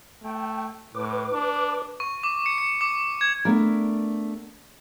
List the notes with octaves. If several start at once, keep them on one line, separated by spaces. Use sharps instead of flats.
A3 G5
A2 B4 D6
D4
C#6
D6
C#7
C#7
D6
G#6
A3 B3 D4 A#4